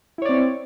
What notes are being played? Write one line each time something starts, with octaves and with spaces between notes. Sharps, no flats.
C4 E4 C#5 D5